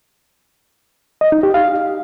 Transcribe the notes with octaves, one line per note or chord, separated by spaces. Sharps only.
D#5
D#4
G4
F5